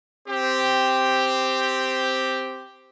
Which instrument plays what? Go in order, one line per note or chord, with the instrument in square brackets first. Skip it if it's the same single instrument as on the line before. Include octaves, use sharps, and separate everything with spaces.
[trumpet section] C4 G4